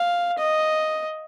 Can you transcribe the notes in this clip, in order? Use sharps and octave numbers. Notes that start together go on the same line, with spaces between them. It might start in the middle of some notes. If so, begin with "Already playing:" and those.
Already playing: F5
D#5